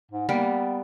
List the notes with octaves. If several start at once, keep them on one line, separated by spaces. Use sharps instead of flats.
G#2
G3 A#3 B3